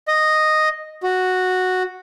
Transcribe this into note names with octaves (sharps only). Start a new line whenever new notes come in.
D#5
F#4